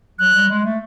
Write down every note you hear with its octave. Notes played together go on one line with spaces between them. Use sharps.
F#3 F#6
G3
G#3
A3